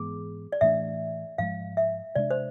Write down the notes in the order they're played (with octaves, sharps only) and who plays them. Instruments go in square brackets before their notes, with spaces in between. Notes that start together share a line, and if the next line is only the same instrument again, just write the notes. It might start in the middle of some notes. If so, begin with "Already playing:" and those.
Already playing: [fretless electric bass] G#2 E3 G#3 B3 [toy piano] G#4
[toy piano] D5
[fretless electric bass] A2 E3 A3 D4 [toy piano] E5
[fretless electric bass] G#2 F3 G#3 [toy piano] F5
[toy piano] E5
[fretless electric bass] C3 G#3 D4 [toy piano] D5
[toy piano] C5